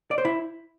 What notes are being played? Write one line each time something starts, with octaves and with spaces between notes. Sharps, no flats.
D5
C5
E4